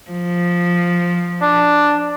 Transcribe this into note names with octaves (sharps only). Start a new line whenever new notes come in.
F3
D4